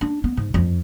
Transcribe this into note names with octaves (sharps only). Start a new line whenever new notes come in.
D4
B3
G#2
F2